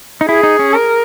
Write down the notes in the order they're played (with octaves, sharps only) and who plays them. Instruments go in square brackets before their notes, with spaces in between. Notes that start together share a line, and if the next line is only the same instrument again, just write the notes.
[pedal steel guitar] D#4
[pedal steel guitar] E4 [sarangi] G#4
[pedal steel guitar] D#4
C#4
[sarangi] A#4